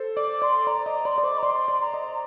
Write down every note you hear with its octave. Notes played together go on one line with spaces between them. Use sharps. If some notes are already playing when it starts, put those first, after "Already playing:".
Already playing: A4 C5
D5 D6
D5 C6
D5 A#5
D#5 A#5
D5 C6
D5
C5 D6
A#5
D5 C6
D5
A#5
D#5